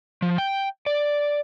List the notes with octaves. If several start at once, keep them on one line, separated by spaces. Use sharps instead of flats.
F3
G5
D5